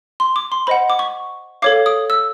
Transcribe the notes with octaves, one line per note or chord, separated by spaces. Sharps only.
C6
D6
C6
C5 D#5 F#5 B5
D6
C#6
A4 C#5 F5 D6
D#6
E6